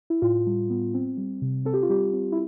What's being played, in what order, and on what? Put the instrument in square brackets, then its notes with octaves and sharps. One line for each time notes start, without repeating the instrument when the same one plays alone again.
[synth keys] E4
A2 F4
G3
B3
C4
G3
C3
C4 A4
G4
F4
G3 C4 G4
C4
E4